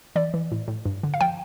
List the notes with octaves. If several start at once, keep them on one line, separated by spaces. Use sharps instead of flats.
E3 D5
E3
A2
A2
G2
D3
F5
F3 G5